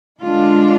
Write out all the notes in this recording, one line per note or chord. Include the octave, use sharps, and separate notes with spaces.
D3 G#3 D4 F4